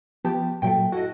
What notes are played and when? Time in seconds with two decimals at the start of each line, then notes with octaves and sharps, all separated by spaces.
0.25 F3 B3 G4 A5
0.62 G2 A#2 F#3 A4 E5 G5
0.92 E4 F#4 A4 D#5